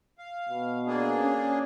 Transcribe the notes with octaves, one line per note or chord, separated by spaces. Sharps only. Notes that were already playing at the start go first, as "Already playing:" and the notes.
F5
B2
A#3 D4 G#4
C#4